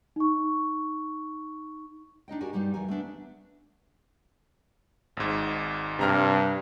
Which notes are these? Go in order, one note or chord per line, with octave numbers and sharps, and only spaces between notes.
D#4 C#6
D4 D#4 D#5 G5
F#4 G4 A#4 D5 G#5
G2 E3 G3 D#4 G4
E2 G2 E3 A#4 G#5
A3 B3 D4 E5
G#1 G#2
G2 C3 A#5 F6